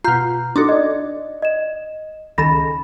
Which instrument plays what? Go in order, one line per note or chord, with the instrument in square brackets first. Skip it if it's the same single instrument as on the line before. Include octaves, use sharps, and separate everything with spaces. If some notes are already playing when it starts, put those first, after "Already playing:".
[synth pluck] B2 F4 [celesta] A#5 G6
[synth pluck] D4 D#4 F#4 [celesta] A4 C6
[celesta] D5 D#5
D#5 E7
[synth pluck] C#2 D#3 A4 [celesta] B5 A#6